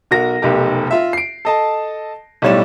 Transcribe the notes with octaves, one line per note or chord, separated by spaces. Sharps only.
B1 F#4 A#4 A#6
F1 B1 G4 A#4
F4 E5
C7 D7
A4 D#5 A5
B1 A2 G3 C#5 D5 E7